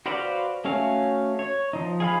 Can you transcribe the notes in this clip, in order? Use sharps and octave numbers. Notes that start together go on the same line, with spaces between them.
F#4 B4 C5 D5 F5
A3 C#4 F#4 F5
C#5
F3 D#4
G#4 F5 B5